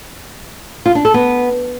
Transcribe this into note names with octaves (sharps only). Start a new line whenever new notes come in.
F4
D4
A4
B3